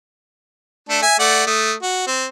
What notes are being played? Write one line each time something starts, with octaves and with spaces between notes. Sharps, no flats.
A3 D4 A4
E5 G#5
A3 D5 F#5
A3 D#6
F#4
C4